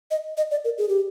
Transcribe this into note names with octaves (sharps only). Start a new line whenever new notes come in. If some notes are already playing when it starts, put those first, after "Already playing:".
D#5
D#5
D5
A#4
G#4
G4